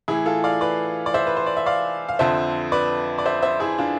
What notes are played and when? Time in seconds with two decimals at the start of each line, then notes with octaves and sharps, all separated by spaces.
0.08 A2 E3 E4 G#4
0.26 F4 A4
0.44 D5 F5
0.61 B4 D5
1.06 D5
1.14 C5 E5
1.27 B4
1.36 C5
1.46 D5
1.57 E5
1.66 D5 F5
2.09 F5
2.19 F2 D3 F3 C5 E5
2.72 B4 D5
3.18 D5
3.26 C5 E5
3.42 C5 E5
3.60 E4 G#4
3.78 D4 F4